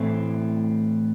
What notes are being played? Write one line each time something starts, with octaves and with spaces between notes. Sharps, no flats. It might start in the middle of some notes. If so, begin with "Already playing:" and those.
Already playing: A2 E3 A3 C4